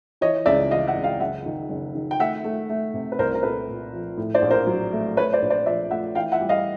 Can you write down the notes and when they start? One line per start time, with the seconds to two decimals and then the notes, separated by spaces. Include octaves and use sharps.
0.21 E3 C#5 D#5
0.46 C#2 D5 E5
0.71 E3 D#5 F5
0.87 E5 F#5
0.96 C#2
1.04 F5 G5
1.20 F#1 E5 F#5
1.46 D#3
1.70 F#1
1.95 D#3
2.11 G5
2.20 A3 E5 F#5
2.44 A3
2.69 A3
2.94 C3
3.12 B4
3.19 C2 A#4 C5
3.35 A#4
3.43 A#2 A4 B4
3.68 A#2
3.93 F3
4.18 A2
4.35 C5 D5
4.42 A#1
4.51 A#4 C5
4.67 F#3
4.93 A3
5.17 A3 B4 C#5
5.33 C5 D5
5.42 A#1
5.50 C5 D5
5.66 F3 D5 E5
5.90 A3 E5 F#5
6.15 E3 F5 G5
6.32 E5 F#5
6.41 G3
6.49 D#5 F5